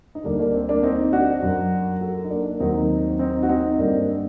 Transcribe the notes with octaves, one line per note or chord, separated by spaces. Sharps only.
D#4
D2 D3 G3 A#3 D4
A#3 D4
C4
A#3 D4
C4 D#4
D4 F#4
F#2 F#3
F#4 A4
D#4
A#3 D4
D#2 D#3 F#3 C4 D#4
C4 D#4
F#4
C4 D#4
G2 D3 G3 A#3 D4
C4